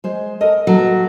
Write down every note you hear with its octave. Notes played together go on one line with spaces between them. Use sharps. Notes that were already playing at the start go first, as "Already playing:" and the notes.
G#3 C5
A4 A#4 D#5
F#3 A#3 A4 B4